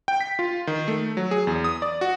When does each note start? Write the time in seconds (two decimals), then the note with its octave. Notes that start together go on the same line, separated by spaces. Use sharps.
0.08 G5
0.21 B6
0.39 F4
0.67 D#3
0.88 A3
1.17 F#3
1.31 G#4
1.47 E2
1.64 D#6
1.82 D5
2.01 F#4